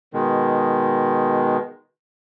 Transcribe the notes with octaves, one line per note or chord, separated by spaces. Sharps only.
B2 D#3 G#3